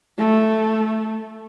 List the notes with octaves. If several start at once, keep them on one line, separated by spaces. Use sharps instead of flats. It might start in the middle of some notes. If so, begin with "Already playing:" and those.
A3